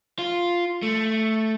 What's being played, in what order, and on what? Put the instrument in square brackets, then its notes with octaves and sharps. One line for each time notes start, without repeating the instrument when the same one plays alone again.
[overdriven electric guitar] F4
A3